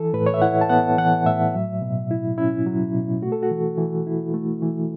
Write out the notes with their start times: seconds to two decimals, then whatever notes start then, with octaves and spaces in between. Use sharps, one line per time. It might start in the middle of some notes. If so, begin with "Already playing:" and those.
Already playing: E3 A4
0.13 A2 B4
0.26 C#5
0.34 E5
0.42 E4 F#5
0.61 A5
0.70 B3 F#5
0.98 E3 F#5
1.25 A2 E5
1.54 F#3
1.82 B2
2.11 E4
2.38 C#4 E4
2.66 F#3
2.94 B2
3.22 A3 F#4
3.32 A4
3.43 F#4
3.51 E3
3.78 E3
4.07 E4
4.34 A3
4.62 E3